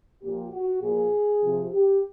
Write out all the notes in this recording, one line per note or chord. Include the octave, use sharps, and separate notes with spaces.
A#2 F3 G4
F#4
A#2 F3 G#4
C3 F3
G4